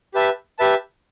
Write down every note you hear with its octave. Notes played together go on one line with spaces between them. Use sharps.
G4 B4 E5 A5
G4 B4 E5 A5